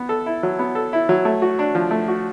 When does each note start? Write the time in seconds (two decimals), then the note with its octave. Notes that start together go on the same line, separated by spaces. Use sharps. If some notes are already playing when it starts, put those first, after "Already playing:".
Already playing: B3
0.09 A4
0.26 E4
0.43 F#3
0.59 B3
0.75 A4
0.93 E4
1.09 F#3
1.25 A3
1.42 F#4
1.59 D4
1.75 F3
1.91 A3
2.08 F#4